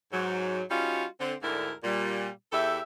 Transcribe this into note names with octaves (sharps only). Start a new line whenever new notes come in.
G#2 F#3
G3 C#4 D#4 F4 F#4
D3 C4
D2 G#2 D3 E4 A#4
A#2 G3
E2 G4 A4 E5